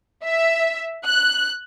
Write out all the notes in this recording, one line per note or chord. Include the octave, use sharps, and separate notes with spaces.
E5
F#6